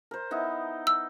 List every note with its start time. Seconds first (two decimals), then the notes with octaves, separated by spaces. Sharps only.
0.11 A#4 C5
0.31 B3 D#4 E4
0.87 E6